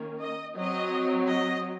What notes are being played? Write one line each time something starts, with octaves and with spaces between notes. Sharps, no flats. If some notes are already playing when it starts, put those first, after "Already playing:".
Already playing: D#3 A#3 C#4
D#5
F#3 C4 D#5
D#5